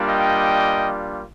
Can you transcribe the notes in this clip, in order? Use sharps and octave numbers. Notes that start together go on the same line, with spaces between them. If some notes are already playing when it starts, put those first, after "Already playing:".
Already playing: G3 A#3 D4 F4
D#5 G5